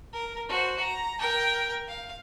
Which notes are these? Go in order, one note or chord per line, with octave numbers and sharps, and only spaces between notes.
A#4
F#4 C5
A#5
A#4 G5
F5